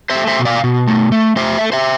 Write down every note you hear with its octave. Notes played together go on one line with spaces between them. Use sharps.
C5 E5
A3
C5 E5
B2
D5 F5
B2
A3
A3
A3 C5 E5
A3
C5 E5